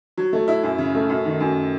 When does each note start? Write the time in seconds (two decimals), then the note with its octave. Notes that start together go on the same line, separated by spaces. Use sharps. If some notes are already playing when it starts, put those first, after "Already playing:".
0.17 F#3
0.33 A3
0.48 E4
0.63 F#2
0.78 C#3
0.95 A3
1.09 F#2
1.25 D#3
1.40 F#2